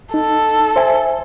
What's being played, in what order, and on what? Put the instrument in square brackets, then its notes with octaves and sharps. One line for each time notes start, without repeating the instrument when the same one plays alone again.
[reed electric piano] D#4 [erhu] A4
[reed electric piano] C5 E5 G#5